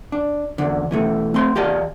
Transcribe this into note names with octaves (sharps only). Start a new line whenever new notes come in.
D4
E2 D3
B2 E3 A3
A3 C4 C6
E2 G4 D5 D#5 F5 A5